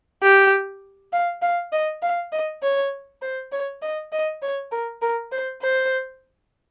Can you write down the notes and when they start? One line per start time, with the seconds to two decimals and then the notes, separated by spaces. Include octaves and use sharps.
0.22 G4
1.13 F5
1.42 F5
1.72 D#5
2.03 F5
2.32 D#5
2.62 C#5
3.22 C5
3.52 C#5
3.82 D#5
4.12 D#5
4.42 C#5
4.71 A#4
5.02 A#4
5.32 C5
5.62 C5